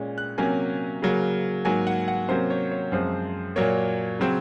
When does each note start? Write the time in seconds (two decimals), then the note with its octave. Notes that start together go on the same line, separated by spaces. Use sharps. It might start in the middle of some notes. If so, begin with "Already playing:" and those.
Already playing: A#2 G#3 C#4
0.18 F#6
0.38 C3 F#3 A#3 C#4 G#5
1.02 C#3 F#3 A#3
1.65 G#2 F#3 A#3 G#5
1.87 F#5
2.08 F#5
2.28 C3 F#3 A#3 C#4 C5
2.50 C#5
2.71 C#5
2.92 F#2 F3 G#3 C4 C5
3.56 A#2 F#3 A#3 C#5
4.19 C#3 F#3 C4